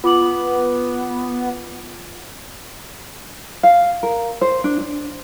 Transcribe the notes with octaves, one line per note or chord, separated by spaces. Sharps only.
B3 F4 D6 F#7
F5
A#4
C5
D4
D4